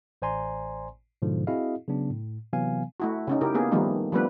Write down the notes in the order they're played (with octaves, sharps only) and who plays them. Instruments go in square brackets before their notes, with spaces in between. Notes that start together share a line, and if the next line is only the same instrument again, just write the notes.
[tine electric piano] A1 C5 D5 G#5 A#5 C6
G#2 B2 D3 F3
C4 E4 F#4 G#4 D#5 F5
C#3 F#3 B3 D4
A2
C3 E3 F#3 B3 F5 G#5
[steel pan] A3 E4 F#4
C#3 C#4 D#4
C#3 E4 G4 A#4
A#3 B3 G#4
D#3 F3 G3 A3 B3 D#4
F3 G3 A3 B3 D4 B4